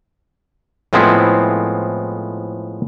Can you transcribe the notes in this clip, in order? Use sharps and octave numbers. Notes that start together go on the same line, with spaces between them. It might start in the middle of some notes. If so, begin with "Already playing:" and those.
A2 F3 G#3 B3 C4 E4